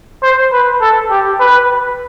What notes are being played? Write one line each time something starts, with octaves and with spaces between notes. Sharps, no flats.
C5
B4
A4
G4
B4